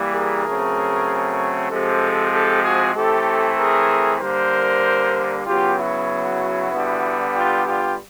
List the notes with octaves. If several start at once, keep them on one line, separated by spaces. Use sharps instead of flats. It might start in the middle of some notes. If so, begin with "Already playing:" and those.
Already playing: E3 G3 A#3
G#4 A#4
C#3 F#3 A3 C4
C3 F3 G#3 C4 G4 A4
G4 A4
F#4 G#4
E3 A3 C4 G4 A4
G#4 A#4
D3 G3 A#3 A#4 C5
C#3 F#3 B3 F4 G4
E4 F#4
D3 G3 B3
F4 G4
F4 G4